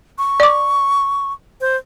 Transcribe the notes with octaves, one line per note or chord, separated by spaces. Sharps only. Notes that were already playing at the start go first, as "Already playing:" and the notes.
C#6
D5 D6
C5